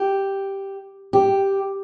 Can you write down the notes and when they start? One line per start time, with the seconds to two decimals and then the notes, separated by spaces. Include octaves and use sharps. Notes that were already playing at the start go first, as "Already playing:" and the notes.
Already playing: G4
1.13 G4